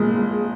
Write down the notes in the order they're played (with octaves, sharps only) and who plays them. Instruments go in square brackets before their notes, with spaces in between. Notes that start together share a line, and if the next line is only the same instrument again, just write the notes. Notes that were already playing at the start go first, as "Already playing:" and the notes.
Already playing: [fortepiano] A#1 G#3